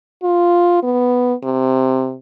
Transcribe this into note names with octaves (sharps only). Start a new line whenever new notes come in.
F4
B3
C3